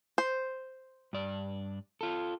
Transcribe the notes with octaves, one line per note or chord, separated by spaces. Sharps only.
C5
G2 D5
F4 A4